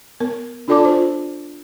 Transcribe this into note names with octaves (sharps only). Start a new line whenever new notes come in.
B3 A#4
D4 F4 A4 D5 A5 D6
F4 C5